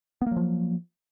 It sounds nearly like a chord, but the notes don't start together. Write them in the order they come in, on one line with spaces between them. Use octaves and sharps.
B3 A#3 F#3 F3